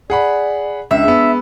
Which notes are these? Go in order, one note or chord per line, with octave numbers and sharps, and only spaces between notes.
G#4 D5 F#5 B5
C#2 D4 E5
G#3 B3